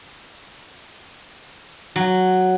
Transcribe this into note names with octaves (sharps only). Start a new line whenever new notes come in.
F#3